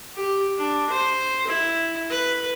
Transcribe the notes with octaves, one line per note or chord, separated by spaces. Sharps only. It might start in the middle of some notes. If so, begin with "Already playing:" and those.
G4
D4
C5
E4
B4